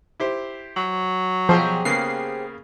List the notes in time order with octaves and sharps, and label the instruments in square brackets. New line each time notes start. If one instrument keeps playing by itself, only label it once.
[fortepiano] E4 G4 C5
[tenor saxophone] F#3
[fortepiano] B2 [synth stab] F3 [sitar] G4 G#4 C5
[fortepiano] C#3 A#3 B3 [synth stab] C7